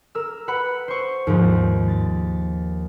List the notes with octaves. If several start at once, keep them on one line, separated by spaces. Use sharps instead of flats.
A#4 E6
B4 F#5 B5
C5 C#6
D#2 G#2 F3
A6